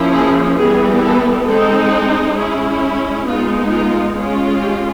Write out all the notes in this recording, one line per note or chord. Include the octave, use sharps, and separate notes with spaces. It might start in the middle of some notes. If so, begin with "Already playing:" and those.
Already playing: F3 A#3 C#4 E4
G#4
E3 G3 B3 G#4
A4
G#3 C4 D#4 A4
G#3 C#4 E4 G#4
G#3 B3 D#4 F4
F4
G#3 C#4 F4
G4